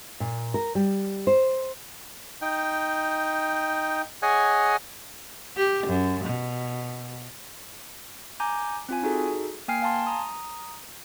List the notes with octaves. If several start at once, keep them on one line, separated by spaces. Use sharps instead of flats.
A#2
A#4
G3
C5
D#4 G5
G#4 C#5 D#5 F#5 G#5
G4
F#2
B2
G#5 A#5 D6 G6
C4 F4 G#5
D#4 F#4 G#4 A4
A#3 G5 G#5 F6 C7
F5 G#5 A5 C6
A#5 D#6